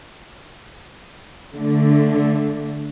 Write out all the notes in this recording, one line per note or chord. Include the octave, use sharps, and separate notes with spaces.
D3 A3